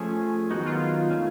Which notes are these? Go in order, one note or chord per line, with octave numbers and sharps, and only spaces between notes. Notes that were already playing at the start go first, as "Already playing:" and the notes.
Already playing: F3 A3 C#4 G#4
D#3 F#3 B3 D#4 F#4
F4
A3 C#4